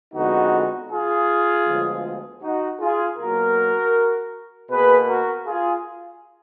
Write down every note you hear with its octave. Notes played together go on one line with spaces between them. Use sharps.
F2 D3 G#3 B3 D#4 F#4
F4 G#4
D2 D3 F3 G#3 B3
D#4 F#4
F4 G#4
B2 F#3 A#3 F#4 A#4
B2 A#3 G#4 B4
F#4 A#4
F4 G#4